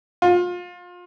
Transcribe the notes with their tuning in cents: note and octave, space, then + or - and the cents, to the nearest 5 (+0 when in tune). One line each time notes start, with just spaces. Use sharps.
F4 +30